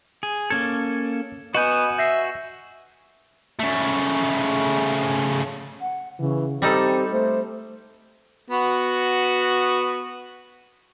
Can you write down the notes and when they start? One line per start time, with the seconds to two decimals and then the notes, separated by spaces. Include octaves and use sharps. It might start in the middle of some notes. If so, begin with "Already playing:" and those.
0.23 G#4
0.50 A#3 C#4 A4 G#6
1.55 B3 F#4 B4 D#5 G#5 G6
1.98 E5 G6 A#6 C7
3.60 C#3 A3
5.81 F#5
6.19 C#3 E3
6.62 G3 C4 D#4 G4 A4
7.12 A3 C5
8.50 B3 F#4